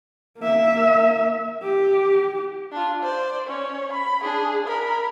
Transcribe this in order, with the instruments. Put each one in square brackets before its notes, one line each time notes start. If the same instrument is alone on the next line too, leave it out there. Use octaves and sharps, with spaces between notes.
[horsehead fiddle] A#3 E5
G4
[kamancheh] D4 F4
C5 D5
C#4 C#5
B5
D4 G#4
A#4 B5